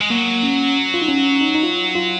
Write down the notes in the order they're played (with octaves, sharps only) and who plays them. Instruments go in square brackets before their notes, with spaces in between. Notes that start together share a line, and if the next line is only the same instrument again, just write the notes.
[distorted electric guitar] G#3
[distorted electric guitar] F#3 [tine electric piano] A#3
[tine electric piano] C#4
F4
D#4
C#4
D#4
D#4
F4
F4